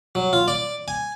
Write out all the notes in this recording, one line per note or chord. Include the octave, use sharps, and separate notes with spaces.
F#3
F4
D5
G#5